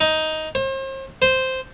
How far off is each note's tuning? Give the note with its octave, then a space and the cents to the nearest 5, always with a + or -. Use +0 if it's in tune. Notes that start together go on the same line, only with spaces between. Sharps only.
D#4 +10
C5 +40
C5 -5